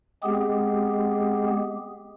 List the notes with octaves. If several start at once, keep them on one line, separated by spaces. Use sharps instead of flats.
G#3 B3 C4 G4 G#4